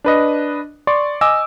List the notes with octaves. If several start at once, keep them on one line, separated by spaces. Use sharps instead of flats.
D4 B4 D#5
D5 C6 C#6
D#5 G#5 D6 E6